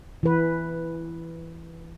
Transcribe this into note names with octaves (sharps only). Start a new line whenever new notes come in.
E3 B4